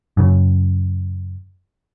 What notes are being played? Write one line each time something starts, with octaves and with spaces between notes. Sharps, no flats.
F#2 C#3